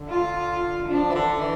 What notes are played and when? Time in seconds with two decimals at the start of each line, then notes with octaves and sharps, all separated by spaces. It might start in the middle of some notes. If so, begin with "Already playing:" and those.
Already playing: D3
0.09 F4
0.88 F3 D4
1.10 E3
1.14 D3
1.40 E3